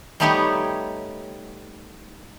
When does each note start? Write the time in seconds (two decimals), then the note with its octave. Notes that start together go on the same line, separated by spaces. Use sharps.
0.20 G3 A3 B3 D#4 G4 C#5